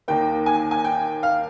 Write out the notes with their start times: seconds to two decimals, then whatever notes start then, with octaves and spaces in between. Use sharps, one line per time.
0.08 D#2 D#3 A#3 G5
0.46 G#5
0.71 G#5
0.84 G5
1.23 F5